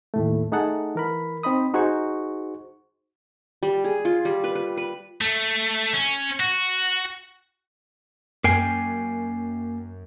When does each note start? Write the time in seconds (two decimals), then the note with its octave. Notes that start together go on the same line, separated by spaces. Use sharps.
0.14 D#2 A2 A3
0.52 A3 D#4 G#4 F#5 A5
0.95 E3 A#4 B5
1.43 C4 D#4 D#5 B5 D#6
1.74 D#4 F#4 G#4 C5 C#6
3.63 G3
3.84 G#4
4.05 F4
4.25 G3
4.44 B4
4.55 B4
4.77 B4
5.21 A3
5.94 C#4
6.40 F#4
8.44 F#2 A#3 G5 G#5 C7